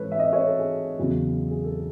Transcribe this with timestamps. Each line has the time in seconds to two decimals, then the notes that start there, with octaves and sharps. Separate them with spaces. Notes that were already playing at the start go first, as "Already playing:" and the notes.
Already playing: G#2 E3 A4 B4 C#5
0.12 E5
0.19 D#5
0.33 C#5
0.46 A4
0.59 G#4
0.98 E2 C#3 F#3
1.51 G#4
1.64 A4